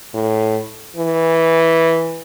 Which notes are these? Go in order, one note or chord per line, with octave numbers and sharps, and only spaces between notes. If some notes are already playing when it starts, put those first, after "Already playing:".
A2
E3